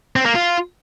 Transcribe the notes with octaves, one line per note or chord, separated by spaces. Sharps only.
C4
A#3
F4